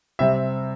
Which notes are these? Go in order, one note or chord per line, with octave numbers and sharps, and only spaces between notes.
C3 G3 C4 E5